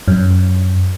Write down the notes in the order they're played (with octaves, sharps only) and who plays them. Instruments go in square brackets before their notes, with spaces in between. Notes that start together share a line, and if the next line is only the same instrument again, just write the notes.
[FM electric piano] F#2